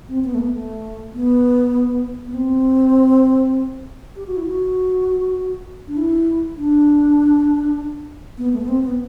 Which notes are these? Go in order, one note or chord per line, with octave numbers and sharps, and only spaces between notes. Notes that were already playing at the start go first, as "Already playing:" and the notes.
C4
B3
A3
B3
A3
B3
B3
C4
G4
F#4
E4
F#4
D4
E4
D4
B3
A3
B3
C4
B3